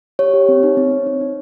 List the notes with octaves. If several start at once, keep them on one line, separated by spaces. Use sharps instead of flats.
G4 C#5
G4
C4
D#4
C4
C4
C4
D#4